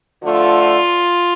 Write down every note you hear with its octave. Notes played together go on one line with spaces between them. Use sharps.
D3 F3 A3 F4